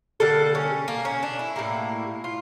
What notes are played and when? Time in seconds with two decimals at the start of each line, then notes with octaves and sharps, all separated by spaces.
0.20 D3 G3 A#3 A4
0.55 C#4
0.88 A#3
1.05 C#4
1.23 D4
1.39 E4
1.56 A2 G3 A#3
2.24 F4